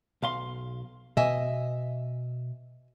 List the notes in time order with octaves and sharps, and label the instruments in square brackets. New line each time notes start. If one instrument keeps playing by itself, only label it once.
[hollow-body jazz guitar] B1 F5 C6
[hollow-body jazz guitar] B2 [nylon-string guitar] D#5 E5 G#5